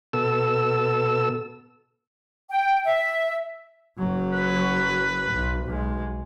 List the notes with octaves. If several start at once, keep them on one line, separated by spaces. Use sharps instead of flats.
B2 A4 E6
G5
E5
F#1 F#3
B4
B1
B1 G#3